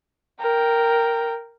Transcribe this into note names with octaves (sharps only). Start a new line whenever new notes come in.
A#4 G5